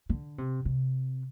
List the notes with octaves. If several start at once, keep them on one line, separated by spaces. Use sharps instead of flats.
D3
C3
C3